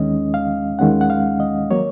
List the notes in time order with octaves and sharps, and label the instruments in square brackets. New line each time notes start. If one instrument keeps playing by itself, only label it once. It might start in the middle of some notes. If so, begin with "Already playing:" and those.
Already playing: [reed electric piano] D#2 D#3 G#3 C#4 D#5
F5
D#2 D#3 G#3 C#4 F#5
F#5
F5
D#5
F#3 A#3 C#5